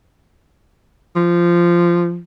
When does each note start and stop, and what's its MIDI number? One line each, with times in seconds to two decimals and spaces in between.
1.16 2.20 53